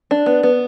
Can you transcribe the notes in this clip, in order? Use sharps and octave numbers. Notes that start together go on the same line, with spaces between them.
D4
B3
B3